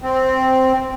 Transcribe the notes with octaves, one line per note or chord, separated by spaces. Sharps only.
C4